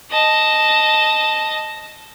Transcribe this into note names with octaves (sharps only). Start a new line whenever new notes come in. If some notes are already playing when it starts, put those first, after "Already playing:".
D#5 A5